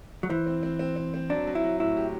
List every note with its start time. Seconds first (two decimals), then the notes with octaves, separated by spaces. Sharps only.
0.23 F#3
0.29 E3 C5
0.46 C4
0.63 C4
0.79 C4
0.96 C4
1.14 C4
1.29 F#3 D4
1.47 F#3
1.55 E4
1.64 F#3
1.80 A2 E4
1.97 G4